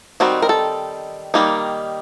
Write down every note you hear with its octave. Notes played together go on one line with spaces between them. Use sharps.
D#3 G3 C4 D#4 F#4
A#4
A4
D#3 G3 A#3 D#4